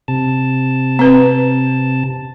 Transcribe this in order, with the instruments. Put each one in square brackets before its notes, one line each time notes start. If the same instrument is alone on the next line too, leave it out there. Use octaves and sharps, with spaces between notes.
[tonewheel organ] C3 A5
[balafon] C4 B4